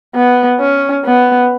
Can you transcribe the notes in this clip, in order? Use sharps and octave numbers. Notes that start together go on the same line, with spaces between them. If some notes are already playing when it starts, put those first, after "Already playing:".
B3
C#4
B3